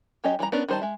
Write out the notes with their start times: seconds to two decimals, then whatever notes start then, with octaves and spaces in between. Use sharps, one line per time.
0.24 F#3 C#4 G4 C#5 D#5
0.39 E3 G3 F#4 A#5
0.52 B3 C#4 D4 A#4 B4
0.69 D#3 G3 C5 D#5 A5
0.82 G#3 E5